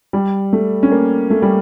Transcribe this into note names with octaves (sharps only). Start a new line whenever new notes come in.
G3
A3
C#4
A#3
A3
G3